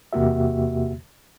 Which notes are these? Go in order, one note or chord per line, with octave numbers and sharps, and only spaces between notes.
E2 C3 A#3 F#4 G4 E5